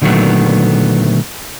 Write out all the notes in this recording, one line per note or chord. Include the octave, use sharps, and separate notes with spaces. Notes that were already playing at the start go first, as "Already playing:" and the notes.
A#2 D3 D#3 F#3 A3 B3